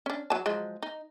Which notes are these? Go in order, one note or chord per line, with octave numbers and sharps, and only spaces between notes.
C#4 D4
F#3 A5
F3 F#3 G#3
D#4